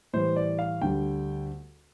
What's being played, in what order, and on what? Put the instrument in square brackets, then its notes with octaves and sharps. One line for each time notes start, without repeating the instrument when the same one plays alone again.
[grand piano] A2 E3 G3 C5
D5
F5
D2 D3 G3 G5